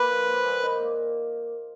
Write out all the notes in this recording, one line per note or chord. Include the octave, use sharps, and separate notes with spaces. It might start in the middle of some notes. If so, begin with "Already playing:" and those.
Already playing: A#2 A#3 F4 B4
F3
A#3
A#2
D#4
A#3